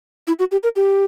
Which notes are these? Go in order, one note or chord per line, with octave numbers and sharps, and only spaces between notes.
E4
F#4
G4
A#4
G4